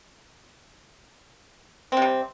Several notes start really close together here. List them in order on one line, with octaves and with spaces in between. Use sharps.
C4 C3 G3